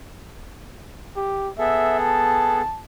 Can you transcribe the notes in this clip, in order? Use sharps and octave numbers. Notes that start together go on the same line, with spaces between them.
G4
B3 G#4 A4 E5
A5